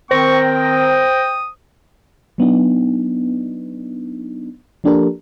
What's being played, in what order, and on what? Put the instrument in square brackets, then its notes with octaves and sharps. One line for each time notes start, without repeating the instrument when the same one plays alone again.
[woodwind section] D#3 C4 A#4 [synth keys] C5 A#6 [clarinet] G5 [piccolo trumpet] C#6
[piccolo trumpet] D#6
[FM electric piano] F#3 B3 D4 D#4
F3 A#3 D4 G4 A4 A#4